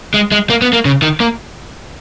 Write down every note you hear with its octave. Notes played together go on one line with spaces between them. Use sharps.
G#3
G#3
A#3
B3
A#3
C#3
D#3
A#3